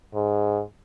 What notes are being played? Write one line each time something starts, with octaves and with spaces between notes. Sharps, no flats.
G#2